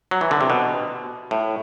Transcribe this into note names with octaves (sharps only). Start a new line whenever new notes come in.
F#3
E3
D3
C3
B2
A2